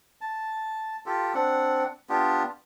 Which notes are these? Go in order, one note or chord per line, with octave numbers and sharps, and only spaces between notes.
A5
F4 G4 A4
C4 D4 F#5
B3 D4 F4 G4